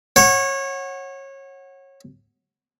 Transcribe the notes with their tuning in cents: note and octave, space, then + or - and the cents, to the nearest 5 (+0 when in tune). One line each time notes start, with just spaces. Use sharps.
C#5 -25 F#5 +0